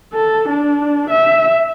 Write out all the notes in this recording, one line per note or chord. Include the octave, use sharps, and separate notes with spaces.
A4
D4
E5